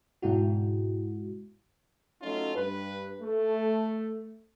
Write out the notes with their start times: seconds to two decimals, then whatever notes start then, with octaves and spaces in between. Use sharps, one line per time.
0.22 G#2 B2 G#3 E4 F#4
2.22 F#3 A3 C#4 D#4 F4
2.55 G2 B4
3.21 A3